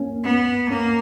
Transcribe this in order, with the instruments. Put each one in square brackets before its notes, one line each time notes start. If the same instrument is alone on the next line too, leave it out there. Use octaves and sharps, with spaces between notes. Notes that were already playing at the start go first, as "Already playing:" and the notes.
Already playing: [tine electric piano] A#3 C#4
[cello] B3
[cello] A#3 [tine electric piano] C#4